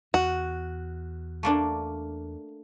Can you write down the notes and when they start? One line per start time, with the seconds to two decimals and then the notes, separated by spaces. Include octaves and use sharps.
0.14 E2 F#4
1.43 A3 A#3 D4